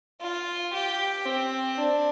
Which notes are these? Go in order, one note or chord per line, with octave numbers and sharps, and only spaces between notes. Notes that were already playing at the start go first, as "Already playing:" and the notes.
F4
G4
C4
D4